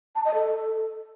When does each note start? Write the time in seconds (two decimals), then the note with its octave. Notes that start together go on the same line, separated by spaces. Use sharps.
0.15 A5
0.25 D#5
0.34 A4